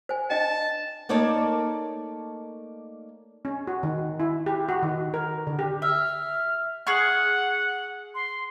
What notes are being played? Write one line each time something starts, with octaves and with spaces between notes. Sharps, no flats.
C5 G#5
D4 D#5 G5 A5
A3 A#3 D#4 C#5 D5 A5
C#4
F#4
D#3
E4
G4
F#4
D#3
A#4
D3
G4
E5 F6
G#4 F#5 C#6 F6
C6